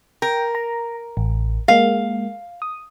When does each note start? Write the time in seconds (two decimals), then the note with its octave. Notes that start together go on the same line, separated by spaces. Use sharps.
0.22 A#4 G5
0.55 A#5
1.17 A1
1.68 G#3 A#3 F5
2.62 D#6